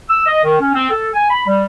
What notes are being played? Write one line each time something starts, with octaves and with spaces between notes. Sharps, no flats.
E6
D#5
D#3
C#4
C4
A4
G#5
B5
G3